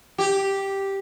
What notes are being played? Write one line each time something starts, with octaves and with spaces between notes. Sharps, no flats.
G4